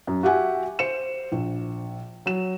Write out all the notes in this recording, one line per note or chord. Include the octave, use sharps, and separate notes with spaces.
F#2
F#4 G4 E5 F#5 G#5
C5 C#7 E7
A#1
F#3 E7